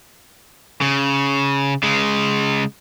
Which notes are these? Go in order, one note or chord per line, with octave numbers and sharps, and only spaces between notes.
C#3
C#3 G#3